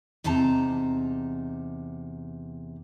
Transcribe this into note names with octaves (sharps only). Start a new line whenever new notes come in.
E2 C3 D#4 A5 A#5